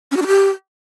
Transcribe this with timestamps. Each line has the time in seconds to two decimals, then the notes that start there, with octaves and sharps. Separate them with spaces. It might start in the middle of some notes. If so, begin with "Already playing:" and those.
0.11 C#4
0.16 F#4
0.22 D4
0.27 G4